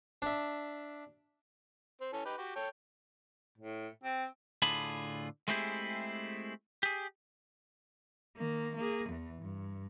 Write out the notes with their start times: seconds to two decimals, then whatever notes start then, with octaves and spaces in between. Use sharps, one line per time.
0.22 D4 E5
2.01 C4
2.13 E3 C#4 A4
2.25 D#4 G4 B4
2.38 F#4 G4
2.56 A4 C#5 G5
3.58 A2
4.04 C4
4.62 A2 D3 F4 G#4 A5 B5
5.48 G#3 A3 C4 E4 G4 G#4
6.83 G4 G#4
8.37 D#3 A#3
8.76 A#3 G#4
9.09 E2 E3
9.42 G2